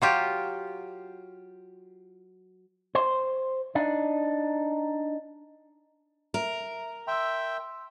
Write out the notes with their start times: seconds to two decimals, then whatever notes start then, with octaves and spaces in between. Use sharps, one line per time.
0.02 F#3 F4 G4
2.95 C5
3.75 D4 D#4
6.34 A#4 E5
7.07 E5 G5 C6 E6